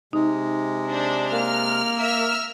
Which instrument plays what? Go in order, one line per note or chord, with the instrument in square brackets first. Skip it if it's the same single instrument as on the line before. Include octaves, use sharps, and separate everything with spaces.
[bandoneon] C3 G#3 [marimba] D#4
[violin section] D4 C5
[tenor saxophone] A#3 [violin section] F6
[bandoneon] A#4 [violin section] E5 E6 F6